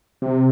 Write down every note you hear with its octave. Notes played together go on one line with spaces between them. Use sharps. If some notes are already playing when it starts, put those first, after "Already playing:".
C3